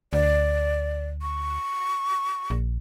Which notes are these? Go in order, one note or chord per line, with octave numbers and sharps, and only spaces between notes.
D2 D5
C#6
A#1